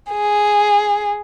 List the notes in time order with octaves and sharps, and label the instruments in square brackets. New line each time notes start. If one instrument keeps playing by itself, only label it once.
[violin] G#4